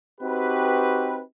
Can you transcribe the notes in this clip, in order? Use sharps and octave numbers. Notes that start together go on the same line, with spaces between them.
C4 D#4 F#4 G4 B4